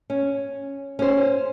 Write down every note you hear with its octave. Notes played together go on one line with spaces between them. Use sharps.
C#4
C#4 C5